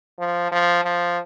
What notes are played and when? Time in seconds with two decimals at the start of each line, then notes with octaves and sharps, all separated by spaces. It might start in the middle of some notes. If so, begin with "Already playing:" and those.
0.19 F3
0.52 F3
0.85 F3